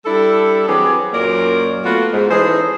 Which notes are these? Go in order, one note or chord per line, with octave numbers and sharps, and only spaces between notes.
G3 D4 E4 A4
E3 F#3 C4 G4 G#4
F#2 A#2 F#3 A#3 A#4 D5
A3 B3 F4 F#4
G#2
E3 C#4 D#4 G#4 A4 C5